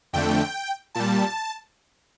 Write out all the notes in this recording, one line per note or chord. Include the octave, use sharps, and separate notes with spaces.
F2 D3 A3 G5
A#2 G3 A5